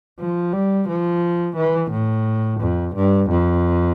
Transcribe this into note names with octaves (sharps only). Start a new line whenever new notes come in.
F3
G3
F3
E3
A2
F2
G2
F2